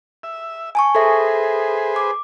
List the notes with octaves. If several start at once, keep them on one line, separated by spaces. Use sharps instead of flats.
E5
G#5 A5 C#6
G#4 A4 B4 C5 E5
D6